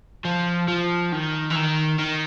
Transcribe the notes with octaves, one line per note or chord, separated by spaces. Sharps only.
F3
F3
D#3
E3
D#3
D#3